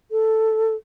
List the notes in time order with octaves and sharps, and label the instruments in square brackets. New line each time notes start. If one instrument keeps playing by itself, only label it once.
[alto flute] A4